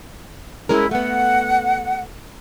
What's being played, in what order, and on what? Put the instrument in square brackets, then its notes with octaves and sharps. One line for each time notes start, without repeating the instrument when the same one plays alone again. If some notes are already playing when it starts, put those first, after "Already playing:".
[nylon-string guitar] G#3 C#4 A#4 [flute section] E4
[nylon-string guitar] A3 B3 [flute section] F#5